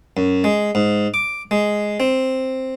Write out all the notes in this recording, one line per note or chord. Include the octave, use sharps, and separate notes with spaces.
F#2
G#3
G#2
D6
G#3
C4